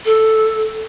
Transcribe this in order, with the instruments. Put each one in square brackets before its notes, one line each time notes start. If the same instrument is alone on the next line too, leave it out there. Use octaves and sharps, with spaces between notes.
[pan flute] A4